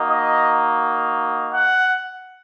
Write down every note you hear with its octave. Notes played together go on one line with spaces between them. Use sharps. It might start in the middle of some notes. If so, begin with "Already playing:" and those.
Already playing: A#3 D#4 F#4
D#5
F#5